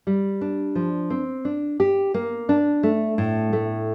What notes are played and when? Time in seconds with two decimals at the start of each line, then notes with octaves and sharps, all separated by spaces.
0.07 G3
0.41 D4
0.75 F3
1.10 C4
1.45 D4
1.80 G4
2.14 A#3
2.49 D4
2.83 A3
3.18 A2
3.53 A3